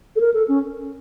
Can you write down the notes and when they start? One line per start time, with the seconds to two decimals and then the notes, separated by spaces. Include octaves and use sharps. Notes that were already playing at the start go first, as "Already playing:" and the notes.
0.16 A4
0.21 A#4
0.34 A4
0.48 C#4